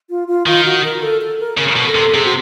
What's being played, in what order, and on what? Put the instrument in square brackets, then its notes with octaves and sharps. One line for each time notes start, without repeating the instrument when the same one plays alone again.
[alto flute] F4
F4
[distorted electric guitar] D#3 [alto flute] F4
[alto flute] F#4
A#4
A4
A4
A#4
[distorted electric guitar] C#3 [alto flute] A#4
[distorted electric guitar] B2
[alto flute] A4
[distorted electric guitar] C3
[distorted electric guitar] C3 [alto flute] G#4
[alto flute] F#4